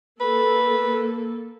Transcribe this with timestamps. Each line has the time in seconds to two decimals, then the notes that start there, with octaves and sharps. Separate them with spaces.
0.20 A#3 A4 B4